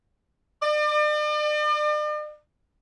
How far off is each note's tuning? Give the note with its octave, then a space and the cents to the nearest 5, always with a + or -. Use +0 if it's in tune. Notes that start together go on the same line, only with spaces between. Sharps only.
D5 +40